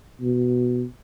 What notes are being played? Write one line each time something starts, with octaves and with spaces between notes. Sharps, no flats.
B2